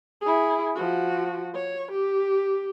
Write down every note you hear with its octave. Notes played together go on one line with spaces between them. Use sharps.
E4 G#4
F3 F#4
C#5
G4